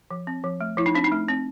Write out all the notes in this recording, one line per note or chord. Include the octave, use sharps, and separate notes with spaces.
F3
C4
F3
A3
F3 E4
D#4
C4 D4
D#4
A3
C4